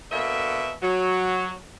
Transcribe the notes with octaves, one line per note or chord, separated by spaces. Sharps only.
B2 D3 A#3 E5
F#3